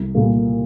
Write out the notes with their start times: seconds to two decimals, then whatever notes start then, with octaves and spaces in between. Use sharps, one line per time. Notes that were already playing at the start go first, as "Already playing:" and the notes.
Already playing: C2
0.14 A#2 G3 A#3